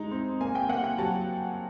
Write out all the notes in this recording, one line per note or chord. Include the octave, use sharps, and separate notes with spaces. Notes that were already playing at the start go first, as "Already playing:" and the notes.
Already playing: G#3 D#4 A#5
C4
A#3 G#5
G5
A#3 F#5
G5
F#3 A5